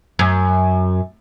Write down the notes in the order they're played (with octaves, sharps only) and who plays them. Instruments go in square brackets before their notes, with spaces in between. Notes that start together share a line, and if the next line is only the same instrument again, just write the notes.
[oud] F#2